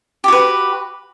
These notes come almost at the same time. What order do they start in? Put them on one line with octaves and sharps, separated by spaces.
G4 F#4 B4